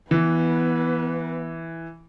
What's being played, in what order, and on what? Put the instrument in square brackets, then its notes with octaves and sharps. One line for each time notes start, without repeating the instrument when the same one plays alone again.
[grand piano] E3 [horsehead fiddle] B3 B4